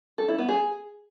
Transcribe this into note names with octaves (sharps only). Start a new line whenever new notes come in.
A4
E4
B3
G#4